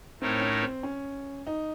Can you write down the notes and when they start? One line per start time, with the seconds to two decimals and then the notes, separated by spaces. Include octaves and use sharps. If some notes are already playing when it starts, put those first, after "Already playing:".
0.21 A2 A3 C4 D#4 A#4 C#5
0.41 C#4
0.63 C4
0.83 C#4
1.47 D#4